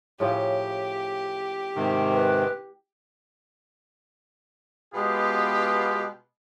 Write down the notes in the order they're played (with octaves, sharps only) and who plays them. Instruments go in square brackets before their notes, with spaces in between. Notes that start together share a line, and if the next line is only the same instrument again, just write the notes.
[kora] A2 C#3 F3 [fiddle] G4
[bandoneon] G#2 C3 D#3
[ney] B4
[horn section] B2 G#3 B3 F4 G4